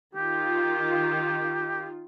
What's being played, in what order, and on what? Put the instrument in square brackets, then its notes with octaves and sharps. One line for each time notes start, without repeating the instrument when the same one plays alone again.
[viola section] D#3 F4 [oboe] G4